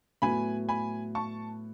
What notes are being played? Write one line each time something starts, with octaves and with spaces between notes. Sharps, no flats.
A2 F#3 B3 G#5 B5
G#5 B5
A5 C#6